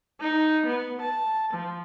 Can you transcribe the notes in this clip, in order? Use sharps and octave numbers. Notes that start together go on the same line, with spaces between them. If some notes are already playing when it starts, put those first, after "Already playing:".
D#4
B3
A5
F3